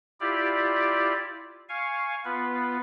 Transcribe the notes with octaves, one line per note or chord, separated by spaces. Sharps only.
E4 F4 G4 D5
F5 G#5 C#6
B3 F4 B4